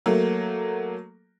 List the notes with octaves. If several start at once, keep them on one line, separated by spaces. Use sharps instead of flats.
F#3 A3 A#3